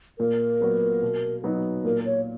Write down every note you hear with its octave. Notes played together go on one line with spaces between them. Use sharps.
A#2 A#4
F#3 B3 F#4
B2
F#3 B3 D#4
A#2 A#4
C#5